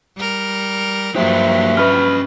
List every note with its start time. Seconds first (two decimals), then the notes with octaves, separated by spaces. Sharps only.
0.17 G3 A#4
1.16 G2 F3 F#3 A#3 G4 C5 E5
1.77 C#4 B4 D#5 B5 F6